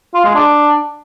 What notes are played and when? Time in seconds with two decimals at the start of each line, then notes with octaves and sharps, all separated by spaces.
0.14 F4
0.25 G#3
0.35 D4